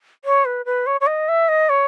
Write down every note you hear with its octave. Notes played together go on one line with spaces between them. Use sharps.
C#5
B4
B4
C#5
C#5
D#5
E5
D#5
C#5